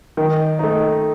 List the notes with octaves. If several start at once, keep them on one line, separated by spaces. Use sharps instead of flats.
D#3
A3 D#4